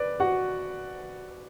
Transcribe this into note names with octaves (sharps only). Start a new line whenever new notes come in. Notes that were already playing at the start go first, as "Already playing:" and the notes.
Already playing: B4 D5
F#4 F#5